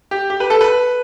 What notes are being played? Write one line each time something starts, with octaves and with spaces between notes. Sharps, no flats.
G4
G4
B4
A4
B4